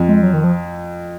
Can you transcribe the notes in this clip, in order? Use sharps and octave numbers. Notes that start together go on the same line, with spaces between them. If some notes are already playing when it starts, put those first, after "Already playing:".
Already playing: F2
G#3
F#3
D#3
F3